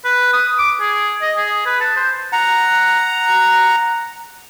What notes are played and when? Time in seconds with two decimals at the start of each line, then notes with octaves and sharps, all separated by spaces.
0.05 B4
0.33 D#6
0.58 D6
0.80 G#4
1.22 D#5
1.36 G#4
1.66 B4
1.81 A5
1.96 C5
2.33 F#5 A#5